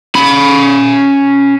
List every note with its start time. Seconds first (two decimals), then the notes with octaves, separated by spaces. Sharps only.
0.15 C#4 B5